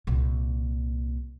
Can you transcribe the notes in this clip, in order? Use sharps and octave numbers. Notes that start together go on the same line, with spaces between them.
C2 A#2